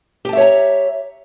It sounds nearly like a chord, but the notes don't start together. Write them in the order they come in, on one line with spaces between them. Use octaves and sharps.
G4 A5 E5 C#5 A#5